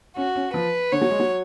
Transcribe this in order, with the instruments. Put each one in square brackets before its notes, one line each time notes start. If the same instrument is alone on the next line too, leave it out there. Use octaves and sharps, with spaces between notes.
[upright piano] C#4 [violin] F#4
[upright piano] C#4
[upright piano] F3 [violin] B4
[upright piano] D3 [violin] C#5
[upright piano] F#3
G#3
F#3